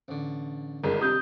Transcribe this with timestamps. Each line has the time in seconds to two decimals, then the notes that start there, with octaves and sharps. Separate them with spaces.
0.08 A1 D3
0.84 G1 D#3 G#3 A4 A#4
1.02 C3 G4 D#6 G6